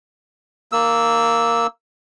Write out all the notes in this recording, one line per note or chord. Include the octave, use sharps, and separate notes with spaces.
A#3 E6